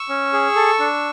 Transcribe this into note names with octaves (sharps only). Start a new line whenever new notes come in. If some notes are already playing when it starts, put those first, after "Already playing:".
Already playing: C#6 E6
C#4
G#4
A4
D4